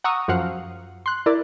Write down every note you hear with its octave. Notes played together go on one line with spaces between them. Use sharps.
F#5 A#5 C#6 D#6 E6
F#2 F3 F#4 F5 F#5
C6 F#6
E4 A#4 D5